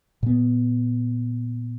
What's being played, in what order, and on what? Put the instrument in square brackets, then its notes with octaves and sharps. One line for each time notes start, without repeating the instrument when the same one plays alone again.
[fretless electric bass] A#2 B3